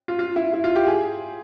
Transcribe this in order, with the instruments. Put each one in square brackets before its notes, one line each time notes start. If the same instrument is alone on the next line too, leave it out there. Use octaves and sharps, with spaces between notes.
[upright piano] F4
F4
E4
E4
F4
G4
G#4